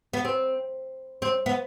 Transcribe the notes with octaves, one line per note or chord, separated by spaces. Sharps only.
B3
C4
C4
B3